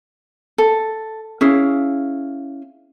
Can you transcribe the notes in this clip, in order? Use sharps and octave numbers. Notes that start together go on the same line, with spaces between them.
A4
C#4 E4 G#4 F5